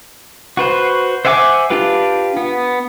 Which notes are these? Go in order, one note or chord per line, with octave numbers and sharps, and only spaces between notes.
F#4 B4 C5
C5 E5 F#5 G#5 D6
D4 F4 G4 B4
B3